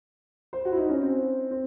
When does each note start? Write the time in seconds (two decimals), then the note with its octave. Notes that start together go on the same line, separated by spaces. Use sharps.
0.53 C5
0.65 F#4
0.72 E4
0.77 D#4
0.89 C#4
1.02 C4
1.51 C4